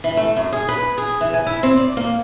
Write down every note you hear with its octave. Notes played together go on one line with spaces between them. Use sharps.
E3
A3
F#2
G#4
B4
G#4
E3
G#5
E4
C4
D5
A#3